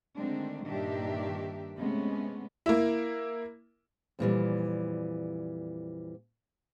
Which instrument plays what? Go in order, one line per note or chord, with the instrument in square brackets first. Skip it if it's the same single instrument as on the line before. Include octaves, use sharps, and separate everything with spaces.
[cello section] D3 D#3 G#3 A3 C4 D4
G2 A#2 D#3 D4 G4 E5
C3 G#3 A3 B3 C#4
[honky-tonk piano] A#3 E4
[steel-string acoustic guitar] F2 A#2 E3 G3